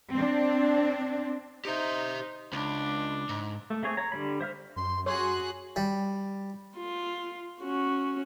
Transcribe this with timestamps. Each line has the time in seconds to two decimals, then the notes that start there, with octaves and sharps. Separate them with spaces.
0.13 C4 D4
1.65 D#4 G4 C5 E5
2.53 C#2 D4
3.29 G#2
3.70 A3
3.83 A3 C4 G#4 C#5
3.97 C#5 A#5
4.12 D3 G3 B5
4.41 C5 E5 F6
4.76 F#2 C6
5.06 F#4 G#4 C#5 C6 F#6
5.76 G3
6.77 F4
7.62 C#4 F#4